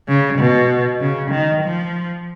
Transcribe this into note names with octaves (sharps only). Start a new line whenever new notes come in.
C#3
B2
C#3
D#3
F3